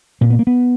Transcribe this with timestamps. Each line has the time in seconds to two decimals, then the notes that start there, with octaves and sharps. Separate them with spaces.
0.21 A#2 C4
0.30 B3
0.39 A#3
0.47 B3